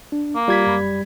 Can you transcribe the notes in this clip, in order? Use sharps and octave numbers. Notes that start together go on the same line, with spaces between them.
D4
A#3
G3 F4 G#6 B6
F#2 B5